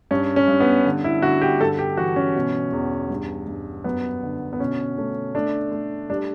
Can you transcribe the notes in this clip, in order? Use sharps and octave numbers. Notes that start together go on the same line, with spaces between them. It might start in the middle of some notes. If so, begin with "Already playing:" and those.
G2 C#4
C#4
G2
B3
D3
E4
D3 F#4
G4
G2 A4
G4
E3 F#4
C#4
B2
E2
G2
G2
F#2 B3
D3
B3
B2 C#4
A3 C#4
A3 D4
A3
G3 D4